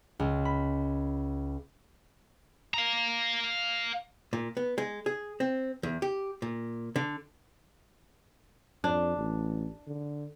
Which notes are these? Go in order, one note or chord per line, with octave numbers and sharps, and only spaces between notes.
C#2
B5
F5 A#5
A#2
B3
G#3
G#4
C4
E2
G4
A#2
D3
F2 D4
A1
D3